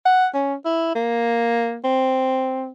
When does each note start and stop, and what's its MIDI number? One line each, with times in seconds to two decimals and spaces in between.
0.05 0.27 78
0.34 0.55 61
0.65 0.93 64
0.95 1.77 58
1.84 2.70 60